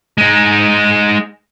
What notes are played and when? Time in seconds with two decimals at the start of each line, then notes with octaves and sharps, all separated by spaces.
0.18 G#3 D#4